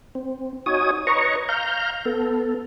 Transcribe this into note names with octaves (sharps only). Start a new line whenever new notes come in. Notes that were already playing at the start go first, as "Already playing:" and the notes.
C4
D#4 F#4 C#5 G#5 D#6
B4 C#5 D#5 A#5 C#6
F5 A#5 F6 G6
B3 A4